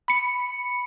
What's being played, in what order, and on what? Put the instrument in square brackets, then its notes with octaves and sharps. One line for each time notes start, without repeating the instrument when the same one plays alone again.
[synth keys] B5 C#7